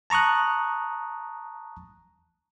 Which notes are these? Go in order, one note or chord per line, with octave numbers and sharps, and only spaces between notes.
A5 A#5 C#6 D#6 F#6